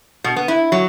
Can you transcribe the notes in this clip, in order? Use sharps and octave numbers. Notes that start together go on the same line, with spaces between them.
B2
B3
E4
F#3